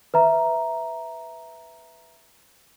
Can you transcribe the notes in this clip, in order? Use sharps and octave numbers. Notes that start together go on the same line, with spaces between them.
B4 E5 A#5